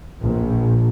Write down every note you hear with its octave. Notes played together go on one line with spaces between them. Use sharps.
A#1